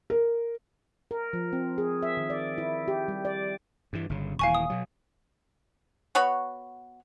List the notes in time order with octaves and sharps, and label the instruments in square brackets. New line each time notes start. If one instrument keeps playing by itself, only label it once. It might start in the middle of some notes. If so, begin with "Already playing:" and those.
[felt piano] A#4
[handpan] A#4
F3
C4
G#4
E5
D#3
D5
E4
G4
G3
D5
[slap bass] G2 E3
G1 C#3
[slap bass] D#1 E3 [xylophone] F5 G#5 C#6
[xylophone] D#6
[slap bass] B2 F#3
[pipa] B3 F#4 C#5 B5